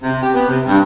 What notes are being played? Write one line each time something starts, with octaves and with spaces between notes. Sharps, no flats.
C3
G4
B3
C3
G2